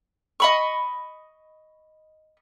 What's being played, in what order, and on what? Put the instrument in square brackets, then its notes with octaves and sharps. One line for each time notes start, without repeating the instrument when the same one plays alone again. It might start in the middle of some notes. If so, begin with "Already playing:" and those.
[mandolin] D#5 B5 C#6